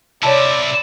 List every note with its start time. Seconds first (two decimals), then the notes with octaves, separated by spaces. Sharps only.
0.23 C3 E4 C#5 D5 A5